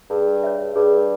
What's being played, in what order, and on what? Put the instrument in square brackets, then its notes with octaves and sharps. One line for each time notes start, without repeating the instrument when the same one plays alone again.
[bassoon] G2 [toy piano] G#4
[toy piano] C#5 E5
[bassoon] G2 [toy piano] G#4